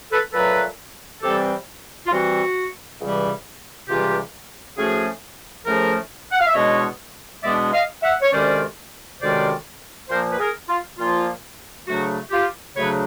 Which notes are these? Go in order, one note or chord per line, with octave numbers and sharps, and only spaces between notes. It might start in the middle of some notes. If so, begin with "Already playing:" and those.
A4 B4
A#2 F#3 A3 A4 B4
C3 E3 G3 C4 G4 A4
F4
C3 E3 G3 C4 F#4
C#2 C3 E3 G3
C#2 C3 E3 G3 F4 G4
A2 F3 A3 C#4 F#4 G#4
A2 F3 A3 C#4 G#4 A#4
F#5
F5
E5
E2 B2 G#3 B3 D4 C#5 D#5
E2 B2 G#3 B3 D4 D5 E5
D#5 F5
E5 F#5
C#5
D2 C3 D#3 G#3 C#4 C5 D5
D2 C3 D#3 G#3 C#4 C5 D5
A#2 F3 A#3 A#4 C5
B4
G#4 A#4
F4
A#2 F3 A#3 F4
D2 C#3 F#3 A3 D4 F#4
F4 G4
D2 C#3 F#3 A3 D4 B4 C#5